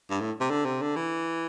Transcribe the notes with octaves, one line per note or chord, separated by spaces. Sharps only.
G2
A2
C3
D3
C3
D3
E3